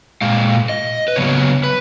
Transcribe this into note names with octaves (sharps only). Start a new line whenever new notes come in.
A#2 G#3 F5
D#5
B4
C#3 F#3 B3 C#5
B4